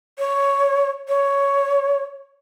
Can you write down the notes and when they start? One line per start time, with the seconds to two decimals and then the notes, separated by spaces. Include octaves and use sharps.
0.19 C#5
1.08 C#5